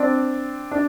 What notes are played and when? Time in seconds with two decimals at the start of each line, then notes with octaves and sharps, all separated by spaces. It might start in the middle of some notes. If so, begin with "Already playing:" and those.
Already playing: C4 D4
0.71 D4